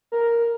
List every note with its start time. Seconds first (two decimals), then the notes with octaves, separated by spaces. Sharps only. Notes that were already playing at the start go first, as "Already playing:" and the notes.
0.12 A#4